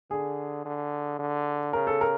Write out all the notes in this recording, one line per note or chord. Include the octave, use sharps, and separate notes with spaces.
D3 G#4
D3
D3
C#3 A#4
A4
A#4